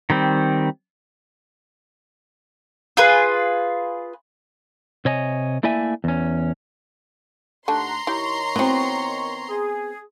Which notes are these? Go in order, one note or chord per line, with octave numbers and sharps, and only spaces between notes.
D#3 G3 C4
F4 G#4 B4
C3 C#5 D#5 G#5
A3 A#3 E4 D5 E5 G#5
E2 C#4
D#2 A3 D4 F#5 A5 A#5 C6
D#3 E4 G4 C#5 C#6
B3 C4 E4 F#4
G#4